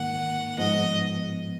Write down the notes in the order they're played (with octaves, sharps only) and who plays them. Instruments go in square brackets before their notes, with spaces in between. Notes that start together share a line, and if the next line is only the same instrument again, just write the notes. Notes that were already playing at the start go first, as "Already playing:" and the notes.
Already playing: [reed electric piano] G#2 D#3 A#3 [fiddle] F#5
[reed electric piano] G#2 F3 B3 [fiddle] D#5